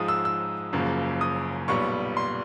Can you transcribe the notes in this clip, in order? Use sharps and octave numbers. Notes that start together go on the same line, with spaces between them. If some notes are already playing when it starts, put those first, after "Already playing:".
Already playing: G#2 F3 G#3 D#6
E6
E6
F#1 F#2 C#3 F3 A#3
D#6
B1 A#2 G3 B3 C#6
C6